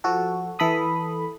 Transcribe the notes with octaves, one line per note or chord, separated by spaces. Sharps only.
F3 F#4 A4
E3 A4 B5 D#6